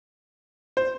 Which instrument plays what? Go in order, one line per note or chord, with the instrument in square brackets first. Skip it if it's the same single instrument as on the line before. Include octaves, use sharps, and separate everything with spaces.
[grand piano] C5